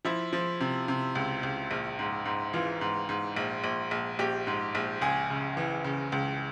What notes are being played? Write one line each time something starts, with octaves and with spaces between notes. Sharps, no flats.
F3 E4
F3
C3
C3
C#2
C#2
A#1
G#2
G#2
E3 F4
G#2
G#2
A#1
A#1
A#1
A#1 G4
G#2
A#1
C#2 G#4
C#3
E3
C#3
C#2